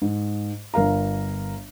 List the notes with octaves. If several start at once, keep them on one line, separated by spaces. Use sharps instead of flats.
G#2
G1 A#4 F5 A#5